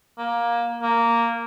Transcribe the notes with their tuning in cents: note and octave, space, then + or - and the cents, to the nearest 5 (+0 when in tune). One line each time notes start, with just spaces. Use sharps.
A#3 +15
A#3 -5